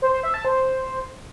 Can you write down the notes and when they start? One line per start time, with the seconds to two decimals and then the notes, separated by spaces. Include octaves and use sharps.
0.02 C5
0.13 C5
0.23 E5
0.34 A5
0.45 C5